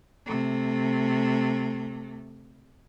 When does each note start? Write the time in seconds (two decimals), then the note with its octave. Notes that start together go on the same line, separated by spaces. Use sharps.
0.26 C3 A3